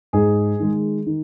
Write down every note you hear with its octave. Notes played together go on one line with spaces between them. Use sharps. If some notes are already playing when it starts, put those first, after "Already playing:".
G#2 G#4
D#3 G#3
D#3